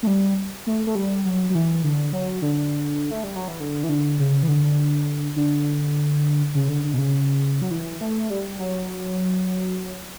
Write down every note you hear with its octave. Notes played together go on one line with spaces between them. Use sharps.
A3
G3
A3
A3
G3
F#3
F#3
E3
D3
F#3
D3
A3
G3
F#3
E3
D3
E3
D3
C#3
E3
D3
D3
C#3
D3
D3
B2
C#3
F#3
E3
A3
G3
F#3